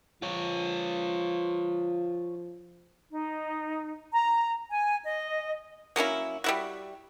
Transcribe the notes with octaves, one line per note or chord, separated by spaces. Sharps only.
F3 F4 C#5
D#4
A#5
G#5
D#5
F#3 A#3 C#4 E4
G3 E4 F#4